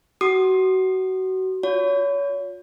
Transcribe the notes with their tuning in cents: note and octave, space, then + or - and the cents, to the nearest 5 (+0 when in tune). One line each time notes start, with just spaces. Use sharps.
F#4 +25 D#6 -25
F4 +40 C#5 +30